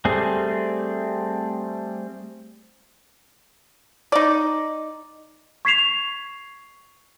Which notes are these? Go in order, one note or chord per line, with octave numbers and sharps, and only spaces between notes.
G3 A3 C4 G#4
D#4 D5
C#6 G#6 B6 C7 E7 F7